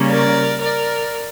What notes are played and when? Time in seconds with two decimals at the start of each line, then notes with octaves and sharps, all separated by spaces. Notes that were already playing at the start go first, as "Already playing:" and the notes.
Already playing: C#3 G3 A#3 C#4
0.11 A#4 D5
0.61 A#4 D5